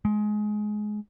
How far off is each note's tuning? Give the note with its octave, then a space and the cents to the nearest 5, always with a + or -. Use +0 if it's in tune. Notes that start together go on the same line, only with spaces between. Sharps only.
G#3 +20